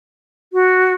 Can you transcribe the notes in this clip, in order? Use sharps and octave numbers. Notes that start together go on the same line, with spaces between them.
F#4